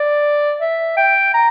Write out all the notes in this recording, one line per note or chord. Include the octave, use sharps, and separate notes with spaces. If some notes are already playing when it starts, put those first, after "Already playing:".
Already playing: D5
E5
G5
A#5